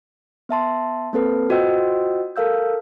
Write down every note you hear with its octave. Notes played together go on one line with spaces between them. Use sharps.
B3 E5 A5 C6
A#3 C4 A4 B4
F4 F#4 C5 D#5 G5 E6
A4 A#4 F5 E6 G6